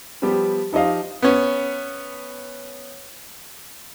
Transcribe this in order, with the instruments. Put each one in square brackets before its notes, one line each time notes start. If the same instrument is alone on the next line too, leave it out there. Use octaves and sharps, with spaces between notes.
[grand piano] F3 G3 B3 G4
F3 D#4 G4 D#5 F5
[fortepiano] B3 C#4